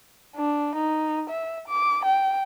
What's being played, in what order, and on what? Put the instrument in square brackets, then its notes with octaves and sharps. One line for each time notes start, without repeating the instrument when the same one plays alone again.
[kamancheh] D4
D#4
E5
D6
G5